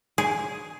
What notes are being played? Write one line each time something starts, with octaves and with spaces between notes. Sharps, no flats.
G#4